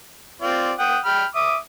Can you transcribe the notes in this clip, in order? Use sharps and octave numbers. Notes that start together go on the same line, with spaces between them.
C4 F4 D5
F#5 G5 D#6
G5 B5 F6
E5 D6 D#6